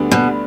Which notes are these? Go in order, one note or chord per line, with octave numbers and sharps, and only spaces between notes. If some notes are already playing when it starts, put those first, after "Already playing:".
Already playing: D2 D3 G3 B3 D4
B2